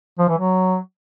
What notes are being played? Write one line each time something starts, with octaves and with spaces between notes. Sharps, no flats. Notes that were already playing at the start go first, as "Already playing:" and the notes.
F3
E3
F#3